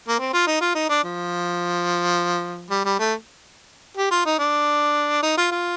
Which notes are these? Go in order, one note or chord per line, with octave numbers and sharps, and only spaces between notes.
A#3
C4
F4
D#4
F4
D#4
D4
F3
G3
G3
A3
G4
F4
D#4
D4
D#4
F4
F4